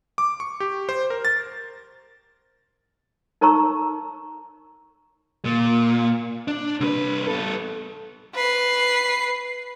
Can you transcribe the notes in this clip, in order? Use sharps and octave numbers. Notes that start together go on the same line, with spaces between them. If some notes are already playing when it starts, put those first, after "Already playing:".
D6
C#6
G4
C5
A#4
A6
D#4 A#4 C#5 A#5 C#6 E6
A#2
D4
C2 B4
B3 A4
B4 C7